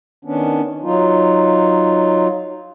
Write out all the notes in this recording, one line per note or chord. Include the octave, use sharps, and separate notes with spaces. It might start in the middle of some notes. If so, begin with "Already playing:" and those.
D#3 B3 C#4 D4
F#3 D#4 F4